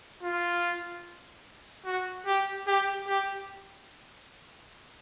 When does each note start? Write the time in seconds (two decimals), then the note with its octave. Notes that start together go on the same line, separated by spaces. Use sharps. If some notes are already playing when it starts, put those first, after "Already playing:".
0.23 F4
1.86 F#4
2.27 G4
2.67 G4
3.08 G4